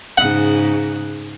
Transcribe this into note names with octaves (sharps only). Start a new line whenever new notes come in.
G#2 C#3 F#5